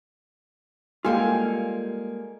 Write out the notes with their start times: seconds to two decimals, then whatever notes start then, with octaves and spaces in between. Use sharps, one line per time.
1.05 G3 G#3 A#3 F4 A4 G5 G#5